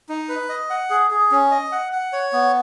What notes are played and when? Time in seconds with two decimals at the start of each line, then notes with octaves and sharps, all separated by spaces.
0.09 D#4
0.29 B4
0.49 D#5
0.70 F#5
0.90 G#4
1.11 G#4
1.31 C#4
1.51 D#5
1.72 F#5
1.93 F#5
2.13 C#5
2.33 B3